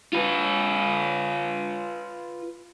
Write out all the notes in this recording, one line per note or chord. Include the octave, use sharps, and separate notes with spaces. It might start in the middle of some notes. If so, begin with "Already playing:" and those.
F4 B4